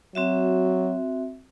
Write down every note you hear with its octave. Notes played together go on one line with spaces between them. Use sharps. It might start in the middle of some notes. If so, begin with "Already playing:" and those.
F#3 C4 F#4 E5